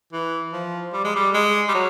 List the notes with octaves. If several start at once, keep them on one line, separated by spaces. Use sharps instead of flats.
E3
F3
G3
G#3
G3
G#3
G3
F#3